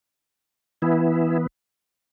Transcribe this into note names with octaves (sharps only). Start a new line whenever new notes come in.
E3 B3 E4